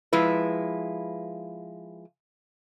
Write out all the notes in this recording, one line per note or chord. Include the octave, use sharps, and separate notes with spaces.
F3 G#3 E4 B4